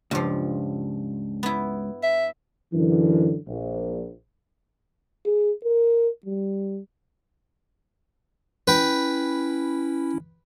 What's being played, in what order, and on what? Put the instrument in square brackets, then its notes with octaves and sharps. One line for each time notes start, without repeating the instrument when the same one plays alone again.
[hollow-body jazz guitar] C#2 [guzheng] G2 F3
[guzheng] B3 E4
[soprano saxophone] E5
[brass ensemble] F#2 D3 E3
A#1
[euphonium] G#4
A#4
G3
[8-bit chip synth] C#4 E4 [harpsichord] B4 G5